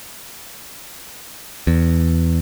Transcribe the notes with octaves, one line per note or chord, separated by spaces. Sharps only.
E2